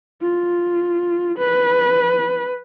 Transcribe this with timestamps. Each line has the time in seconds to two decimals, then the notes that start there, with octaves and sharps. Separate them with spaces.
0.22 F4
1.39 B4